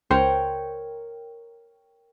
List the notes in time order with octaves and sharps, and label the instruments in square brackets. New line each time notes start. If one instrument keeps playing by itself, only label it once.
[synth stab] C#2 C5 [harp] A#4 C#5 G5